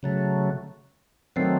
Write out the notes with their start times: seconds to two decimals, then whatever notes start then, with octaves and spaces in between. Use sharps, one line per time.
0.03 C#3 F#3 A3
1.36 D#3 F#3 A3 C4